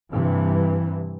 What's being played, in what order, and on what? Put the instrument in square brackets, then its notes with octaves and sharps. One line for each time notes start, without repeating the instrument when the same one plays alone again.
[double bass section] G2 C3 E3